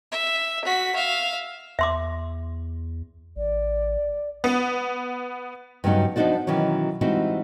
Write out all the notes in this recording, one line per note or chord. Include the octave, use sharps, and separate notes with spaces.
E5
F#4 B6
E5 F5
E2 E5 C6 D6
A1 D5
B3
G2 C#3 F#3 B3 D#4
F3 B3 D4 D#4 F#4 D5
B2 D#3 E3 F#3 C#4
E3 G3 G#3 C4 D#4 F#4